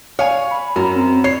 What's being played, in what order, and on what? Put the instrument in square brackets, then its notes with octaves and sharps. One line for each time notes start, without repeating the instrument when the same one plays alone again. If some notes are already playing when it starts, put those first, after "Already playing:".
[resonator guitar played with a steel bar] C#5 [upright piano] F5 G#5
[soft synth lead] B5
[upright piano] F#2 [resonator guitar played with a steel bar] A#4
[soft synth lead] C4
[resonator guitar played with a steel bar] C#5 [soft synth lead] G#6 [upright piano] C7